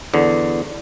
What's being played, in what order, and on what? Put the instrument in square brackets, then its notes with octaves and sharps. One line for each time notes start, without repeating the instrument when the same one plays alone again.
[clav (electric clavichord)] E2 D3